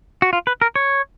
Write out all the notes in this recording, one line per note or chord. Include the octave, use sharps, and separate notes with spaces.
F#4
F4
B4
A#4
C#5